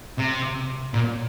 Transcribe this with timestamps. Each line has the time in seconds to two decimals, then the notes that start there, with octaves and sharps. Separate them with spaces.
0.18 C3
0.94 A#2